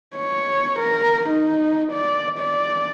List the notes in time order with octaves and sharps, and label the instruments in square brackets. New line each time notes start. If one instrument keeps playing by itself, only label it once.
[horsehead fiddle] C#5
A#4
D#4
D5
D5